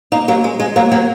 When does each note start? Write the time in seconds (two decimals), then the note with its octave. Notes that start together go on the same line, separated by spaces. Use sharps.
0.12 A#3 D#4
0.28 F#3 A#3
0.44 G#3
0.60 G#3
0.76 F#3 A#3
0.91 F#3 A#3